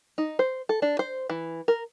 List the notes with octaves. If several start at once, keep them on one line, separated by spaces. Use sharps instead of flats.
D#4
C5
A4
D4
C5
E3
A#4